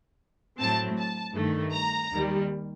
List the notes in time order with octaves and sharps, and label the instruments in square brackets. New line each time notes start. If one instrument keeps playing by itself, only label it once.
[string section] A2 F#3 C4 A5
A5
G2 D#3 A3
A#5
D#2 D#3 G3